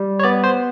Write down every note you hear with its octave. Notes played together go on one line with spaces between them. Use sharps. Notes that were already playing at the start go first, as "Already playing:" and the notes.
Already playing: G3
C#5
B3 D5
C5